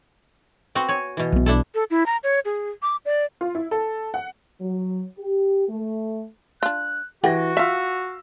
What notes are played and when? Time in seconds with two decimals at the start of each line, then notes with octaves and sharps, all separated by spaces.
0.75 B3 C4 F#4
0.89 C#5 G#5
1.17 B2 E3
1.32 B1 B3
1.46 D4 E4 A4
1.74 A4
1.91 E4
2.06 A#5
2.23 C#5
2.45 G#4
2.82 D6
3.05 D5
3.41 F4
3.55 E4
3.71 A4
4.14 F#5
4.61 F#3
5.19 G4
5.69 A3
6.63 D4 F4 F#6
7.24 E3 F#4 G4 F#5 G5 A#6
7.57 F4 E5 F5 E6 B6